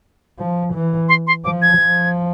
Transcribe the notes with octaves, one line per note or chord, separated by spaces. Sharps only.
F3
E3
C6
C6
F3 D6
G#6
F3